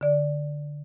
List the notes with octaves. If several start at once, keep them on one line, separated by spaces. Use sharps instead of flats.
D3 D5